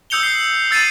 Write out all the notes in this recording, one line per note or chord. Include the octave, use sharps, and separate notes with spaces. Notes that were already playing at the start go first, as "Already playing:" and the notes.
D#6 E6 G6 C#7 F7 G7
C7 C#7 G7
E6 A6 C7 D#7 E7